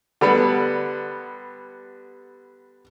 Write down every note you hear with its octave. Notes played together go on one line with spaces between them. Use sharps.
D3 G3 B3